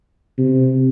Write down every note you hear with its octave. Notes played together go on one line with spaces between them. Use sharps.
C3